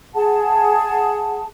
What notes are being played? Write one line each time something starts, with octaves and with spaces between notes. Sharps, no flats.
G#4 F#5 A5